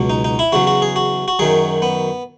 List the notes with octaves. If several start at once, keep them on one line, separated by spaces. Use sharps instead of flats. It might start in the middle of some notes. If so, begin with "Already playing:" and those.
Already playing: C#2 B2 F#3
D#4
D#4
E4
E2 C#3 F#3 F#4
F#4
G#4
F#4
F#4
F#2 D#3 F#3 G#4
B3